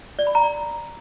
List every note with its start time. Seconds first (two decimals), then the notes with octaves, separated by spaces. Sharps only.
0.19 D5
0.27 B5
0.35 A#5
0.43 D5